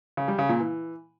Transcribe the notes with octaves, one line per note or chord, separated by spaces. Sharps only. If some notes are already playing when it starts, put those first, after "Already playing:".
C#3
G3
C#3
A#2
E3